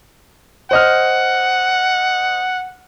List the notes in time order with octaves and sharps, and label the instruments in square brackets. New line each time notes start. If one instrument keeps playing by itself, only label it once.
[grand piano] C5 D#5 F6 [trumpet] F#5